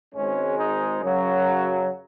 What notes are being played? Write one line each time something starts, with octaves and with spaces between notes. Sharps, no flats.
G#1 G#2 G#3 C#4
D#4
F#2 C#3 F#3